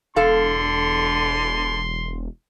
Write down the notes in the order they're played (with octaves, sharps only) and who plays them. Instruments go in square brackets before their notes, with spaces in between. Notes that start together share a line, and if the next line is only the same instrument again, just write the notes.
[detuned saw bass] E1 [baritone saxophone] D3 [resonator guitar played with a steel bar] A4 F5 [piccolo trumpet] C6